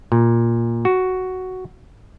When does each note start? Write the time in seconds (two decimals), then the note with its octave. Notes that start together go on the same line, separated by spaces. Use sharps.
0.12 A#2
0.85 F#4